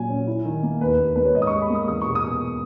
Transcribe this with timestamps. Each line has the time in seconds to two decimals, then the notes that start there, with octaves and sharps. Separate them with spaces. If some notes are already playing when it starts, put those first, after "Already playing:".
Already playing: A#2 F#3 G#5
0.09 C#4
0.27 E4
0.45 D#3
0.63 A#3
0.81 D#2 B4
0.99 D#2
1.16 A#3 B4
1.25 C#5
1.35 G#2 D#5
1.42 D#6
1.47 C#6
1.52 G#2
1.61 B5
1.70 A#3 D#6
1.88 E2 D#6
2.02 C#6
2.06 B2
2.15 D#6
2.24 B2